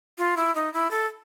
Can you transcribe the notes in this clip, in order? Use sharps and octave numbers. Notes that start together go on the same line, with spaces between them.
F4
E4
D#4
E4
A4